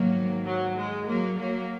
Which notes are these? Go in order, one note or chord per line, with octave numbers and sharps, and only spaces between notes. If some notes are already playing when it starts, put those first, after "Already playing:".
Already playing: G#2 D#3 F#3 A#3
F#3
G#3
F#3 A#3
F#3 A#3